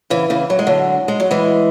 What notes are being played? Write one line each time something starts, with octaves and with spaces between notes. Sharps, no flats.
C#3 E3
C#3 E3
F#3
G#3
D3 F#3
G#3
F#3
E3 G#3